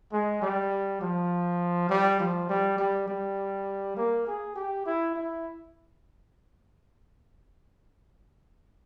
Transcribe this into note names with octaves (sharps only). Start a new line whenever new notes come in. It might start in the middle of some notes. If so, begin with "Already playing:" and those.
G#3
G3
F3
G3
F3
G3
G3
G3
A#3
G#4
G4
E4
E4